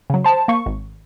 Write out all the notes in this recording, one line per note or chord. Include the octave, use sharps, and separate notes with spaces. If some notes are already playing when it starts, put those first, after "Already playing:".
C#3 F#3
C5 A5
A#3 C#6
G#1